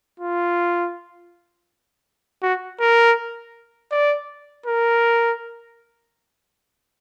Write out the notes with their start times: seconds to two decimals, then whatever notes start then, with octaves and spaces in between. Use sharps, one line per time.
0.20 F4
2.42 F#4
2.80 A#4
3.91 D5
4.66 A#4